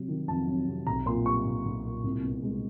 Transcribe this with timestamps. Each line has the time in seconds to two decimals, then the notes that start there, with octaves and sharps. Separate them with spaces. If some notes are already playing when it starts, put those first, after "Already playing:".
Already playing: C3 F#3
0.08 D#3
0.28 F2 A5
0.47 F#3
0.67 C3
0.87 B1 A#5
1.06 A#2 C6
1.26 G3 C#6
1.45 B1
1.65 B1
1.84 A#2
2.04 C2
2.23 B2
2.43 G#3